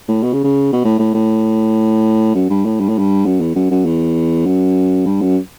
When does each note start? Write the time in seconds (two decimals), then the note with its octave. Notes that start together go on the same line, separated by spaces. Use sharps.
0.08 A2
0.23 B2
0.33 C#3
0.44 C#3
0.73 B2
0.84 A2
0.99 A2
1.14 A2
2.35 F#2
2.50 G2
2.65 A2
2.80 G2
2.89 A2
2.98 G2
3.25 F#2
3.41 E2
3.55 F#2
3.71 F#2
3.85 E2
4.46 F#2
5.06 G2
5.22 F#2